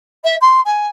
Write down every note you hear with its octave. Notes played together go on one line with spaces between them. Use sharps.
E5
C6
G#5